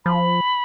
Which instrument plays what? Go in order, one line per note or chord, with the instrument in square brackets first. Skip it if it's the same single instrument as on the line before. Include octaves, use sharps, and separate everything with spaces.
[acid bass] F3 [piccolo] B5